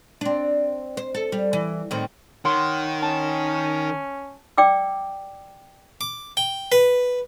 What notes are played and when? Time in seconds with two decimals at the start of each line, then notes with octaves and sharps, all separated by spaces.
0.21 C4 D4
0.97 C5
1.15 A4
1.32 G3
1.53 E3
1.91 A2 D#3 C4
2.45 D#3 C#5 F#5 C6
3.02 C#4 A5
4.58 D5 G5 D6 E6
6.01 D6
6.37 G5
6.72 B4